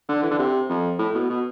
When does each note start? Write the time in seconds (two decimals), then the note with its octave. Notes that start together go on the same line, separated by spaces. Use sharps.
0.09 D3
0.23 E3
0.31 D3
0.39 C3
0.69 F2
0.99 A2
1.14 B2
1.30 B2